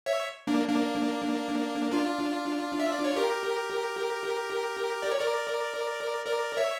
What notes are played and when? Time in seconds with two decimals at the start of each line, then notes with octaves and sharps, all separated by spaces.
0.06 C#5 E5
0.47 A#3 D4
0.68 A#3 D4
1.92 D4 F4
2.80 E5
2.92 D5
3.04 C#5
3.16 G4 A#4
5.02 D5
5.11 C#5
5.20 A#4 D5
6.25 A#4 D5
6.57 C#5 E5